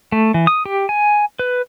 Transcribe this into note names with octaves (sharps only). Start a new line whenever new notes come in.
A3
E3
D#6
G4
G#5
B4